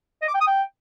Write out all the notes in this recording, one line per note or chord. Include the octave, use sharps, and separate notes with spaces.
D#5
D6
G5
D#6
G5